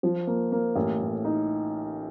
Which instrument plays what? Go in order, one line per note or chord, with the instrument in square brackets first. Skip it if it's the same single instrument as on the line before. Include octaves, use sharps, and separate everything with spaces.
[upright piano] F3
A#3
A#3
A1
A2
D#4